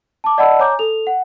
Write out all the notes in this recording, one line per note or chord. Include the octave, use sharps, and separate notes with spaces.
A5 D6
D5 D#5 F#5 A5 B5 E6
C#5 G#5 A#5 D6 G6
A4 F7
F#5